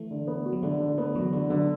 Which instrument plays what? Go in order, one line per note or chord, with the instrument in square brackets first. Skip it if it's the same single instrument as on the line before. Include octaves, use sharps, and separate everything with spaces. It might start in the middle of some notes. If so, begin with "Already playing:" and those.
Already playing: [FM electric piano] E3 A3
[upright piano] D3
B3
F#4
[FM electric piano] F#3
[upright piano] D3 [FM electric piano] E3 A3
[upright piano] D3
[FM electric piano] E3 A3 [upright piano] B3
[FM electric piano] D3 F#3 [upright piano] F#4
[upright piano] D3 [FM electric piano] E3 A3
[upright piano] D3 [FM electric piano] F#3 B3